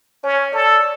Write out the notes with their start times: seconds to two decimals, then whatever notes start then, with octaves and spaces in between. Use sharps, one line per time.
0.24 C#4 C#5
0.52 A4 D5